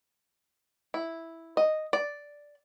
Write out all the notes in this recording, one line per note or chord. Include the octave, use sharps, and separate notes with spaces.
E4
D#5
D5